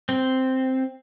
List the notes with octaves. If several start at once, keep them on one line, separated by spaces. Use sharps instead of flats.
C4